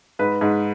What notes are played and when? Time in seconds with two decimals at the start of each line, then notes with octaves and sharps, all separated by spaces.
0.19 G#2 B4
0.41 G#2